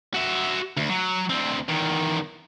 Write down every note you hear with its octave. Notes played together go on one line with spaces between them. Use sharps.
F#4 E5
D2
F#3
D2 C4
E2 D#3